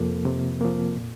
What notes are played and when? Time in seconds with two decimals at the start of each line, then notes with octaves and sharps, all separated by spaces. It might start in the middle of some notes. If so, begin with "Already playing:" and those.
Already playing: F2 C3 F3 A#3
0.25 C3
0.61 F3 A#3
0.95 A#2